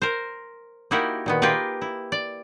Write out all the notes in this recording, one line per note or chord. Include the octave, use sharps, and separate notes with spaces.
A#4 C5
A#3 D#4 E4 F#4 G4 A#4
A#2 D#3 B3
A#3 F4 G4 G#4 A#4 B4
E4
D5